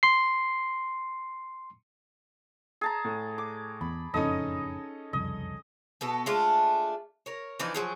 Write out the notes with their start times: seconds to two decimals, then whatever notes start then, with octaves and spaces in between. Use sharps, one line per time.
0.03 C6 C7
2.81 G#4 A5 A#5
3.04 A2
3.38 D6
3.81 E2 B5
4.14 F#1 F2 A2 C#4 D#4 A4 D#5 D#6
5.13 F#1 C2 F2 D#5
6.01 B2 B3 A4
6.26 G#3 A3 D4 F4
7.26 A#4 C#5
7.59 E3 F3 D4 D#4
7.74 F3 F#3 G#4